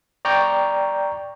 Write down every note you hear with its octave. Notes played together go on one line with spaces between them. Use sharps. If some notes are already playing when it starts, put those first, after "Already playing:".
D5 G5 A#5 C#6 G6